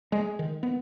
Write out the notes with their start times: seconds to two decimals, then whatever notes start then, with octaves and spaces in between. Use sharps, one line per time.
0.12 G#3
0.39 D#3
0.63 B3